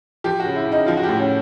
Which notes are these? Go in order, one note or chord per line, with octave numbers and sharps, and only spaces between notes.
F3 G4
C#3 F#4
E4
C#3
D#4
F3 F4
F#4
G4
A2
C#4